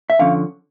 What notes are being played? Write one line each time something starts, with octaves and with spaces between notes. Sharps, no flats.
E5
D3 F3 C#4 F5